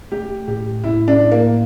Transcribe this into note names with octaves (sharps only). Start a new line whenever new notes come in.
A3 G4
A2 G4
A2 E4
D4
A2
A#3